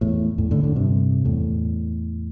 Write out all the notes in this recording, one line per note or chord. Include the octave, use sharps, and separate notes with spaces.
E2 A2
E2 A2
A2 D3
A2 D3
G2 C3
E2 A2